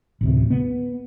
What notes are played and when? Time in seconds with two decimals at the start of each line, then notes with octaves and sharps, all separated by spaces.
0.21 A1 D2 C3
0.50 B3